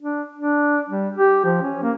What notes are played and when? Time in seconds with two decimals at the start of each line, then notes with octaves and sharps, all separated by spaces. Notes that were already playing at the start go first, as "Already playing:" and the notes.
0.01 D4
0.36 D4
0.90 G3
1.18 G4
1.45 F3
1.62 C#4
1.83 A#3